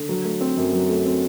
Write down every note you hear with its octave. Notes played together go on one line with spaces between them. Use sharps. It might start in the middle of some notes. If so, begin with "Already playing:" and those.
Already playing: D3
F#3
A3
C4
F#2
F#3
A3
C4